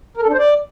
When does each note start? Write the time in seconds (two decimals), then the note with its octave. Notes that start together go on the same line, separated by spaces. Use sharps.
0.17 A#4
0.23 A4
0.28 D4
0.33 C5
0.39 D5